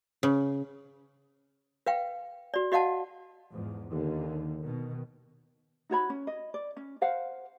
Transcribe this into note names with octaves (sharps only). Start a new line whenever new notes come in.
C#3
B4 F5 G5
F#4 D5
F#4 D#5 F5 F#5 A5
E2 G#2 F3
D#2 D3 D#3
B2 D#3
D#4 F#4 C#5 B5
C#4
D#5
D5
C#4
A#4 C5 F5 F#5